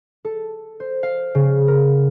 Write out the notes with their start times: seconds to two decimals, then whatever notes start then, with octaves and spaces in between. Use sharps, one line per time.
0.25 A4
0.80 C5
1.03 F5
1.35 C#3
1.68 A#4